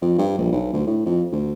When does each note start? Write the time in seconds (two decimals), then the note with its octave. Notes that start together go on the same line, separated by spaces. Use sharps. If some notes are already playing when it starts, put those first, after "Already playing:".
0.02 F2
0.18 G2
0.38 A#1
0.52 B1
0.73 D2
0.87 A2
1.06 F2
1.32 D2